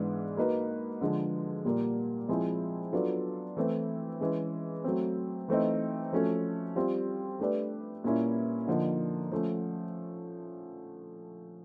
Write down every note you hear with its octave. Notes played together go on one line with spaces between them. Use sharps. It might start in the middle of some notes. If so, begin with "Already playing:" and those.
Already playing: G#2 E3 G#3 B3 D4
A#3 D#4 F#4 B4
D3 F3 G#3
A#2 G3 A#3
F3 G#3 C4 E4 G#4
F#3 B3 D4 F4 A4
E3 A3 C4 E4
E3 G#3 C#4
F#3 A3 C4
E3 A3 C4 D#4
F3 A3 C#4 F#4 A4
G3 C4 F4
A3 D4 G4 B4 D5
A#2 G3 A#3 C#4 E4
D3 F3 A#3 D#4
F3 A3 C#4